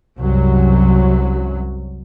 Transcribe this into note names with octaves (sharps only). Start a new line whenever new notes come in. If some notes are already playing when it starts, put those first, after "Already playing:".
C2 F#2 F#3